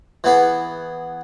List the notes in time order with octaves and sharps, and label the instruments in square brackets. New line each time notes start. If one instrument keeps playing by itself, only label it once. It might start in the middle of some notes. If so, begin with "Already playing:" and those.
[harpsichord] E3 B3 G#4